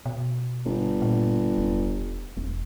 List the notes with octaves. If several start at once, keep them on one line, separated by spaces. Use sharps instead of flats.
B2
G1
A#2
E1
E1